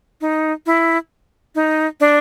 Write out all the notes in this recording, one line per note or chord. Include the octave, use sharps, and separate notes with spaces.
D#4
E4
D#4
D4